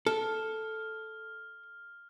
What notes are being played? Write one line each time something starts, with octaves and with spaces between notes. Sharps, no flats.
A4 F6